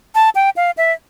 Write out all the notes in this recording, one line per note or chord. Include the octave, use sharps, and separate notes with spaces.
A5
G5
F5
E5